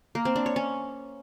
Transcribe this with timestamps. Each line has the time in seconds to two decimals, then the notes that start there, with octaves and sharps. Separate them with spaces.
0.15 A#3
0.25 C4
0.36 D4
0.46 C#5
0.56 C#4